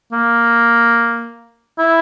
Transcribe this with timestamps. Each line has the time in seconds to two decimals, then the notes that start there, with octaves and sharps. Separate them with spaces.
0.12 A#3
1.79 E4